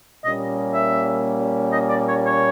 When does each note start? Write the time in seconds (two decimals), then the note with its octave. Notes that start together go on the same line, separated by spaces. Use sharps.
0.24 A#2 G3 A#3 C#4 D#5
0.74 E5
1.72 D#5
1.89 D5
2.08 C#5
2.26 C#5